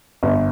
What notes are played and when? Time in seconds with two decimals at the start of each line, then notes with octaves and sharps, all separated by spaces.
0.23 G1